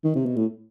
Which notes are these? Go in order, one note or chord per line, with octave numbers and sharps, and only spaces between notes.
D#3
C3
B2
A2